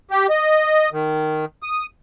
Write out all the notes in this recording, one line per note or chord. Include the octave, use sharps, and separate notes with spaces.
G4
D#5
D#3
D#6